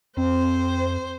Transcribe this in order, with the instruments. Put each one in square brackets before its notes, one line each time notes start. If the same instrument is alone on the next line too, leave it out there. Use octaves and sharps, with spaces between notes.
[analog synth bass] F2 [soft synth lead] C4 [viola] C5